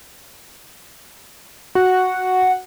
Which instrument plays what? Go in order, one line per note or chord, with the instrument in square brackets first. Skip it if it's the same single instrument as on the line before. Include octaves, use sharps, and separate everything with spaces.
[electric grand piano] F#4 [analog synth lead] F#5